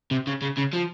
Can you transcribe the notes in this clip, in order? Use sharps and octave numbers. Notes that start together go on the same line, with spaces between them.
C3
C#3
C#3
C#3
F3